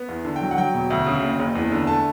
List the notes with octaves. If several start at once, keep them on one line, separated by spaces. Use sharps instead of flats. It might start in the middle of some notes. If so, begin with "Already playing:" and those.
Already playing: B3
E2
D3
G5
F#3
F#5
F#3 G5
E1
D2
C#3
F#1
F#1
E2
D3
A3 A5